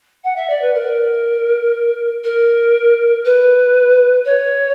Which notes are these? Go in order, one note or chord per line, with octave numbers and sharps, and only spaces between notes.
F#5
E5
D5
B4
A#4
A#4
B4
C#5